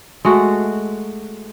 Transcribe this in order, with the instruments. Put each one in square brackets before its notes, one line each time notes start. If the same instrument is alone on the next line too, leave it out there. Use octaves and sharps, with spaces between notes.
[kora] G#3 A3 F#4